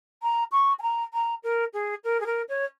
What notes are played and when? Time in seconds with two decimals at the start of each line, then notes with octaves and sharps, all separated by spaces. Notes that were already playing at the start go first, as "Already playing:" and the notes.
0.23 A#5
0.52 C#6
0.79 G#5
0.82 A#5
1.14 A#5
1.43 A#4
1.74 G#4
2.04 A#4
2.20 G#4
2.26 A#4
2.49 C#5